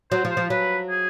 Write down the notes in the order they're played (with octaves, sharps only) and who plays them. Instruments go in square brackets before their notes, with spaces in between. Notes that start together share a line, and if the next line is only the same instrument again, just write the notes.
[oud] F#3 [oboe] C5
[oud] F3
[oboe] C5
[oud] F3
[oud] F#3 [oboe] B4
[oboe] G#4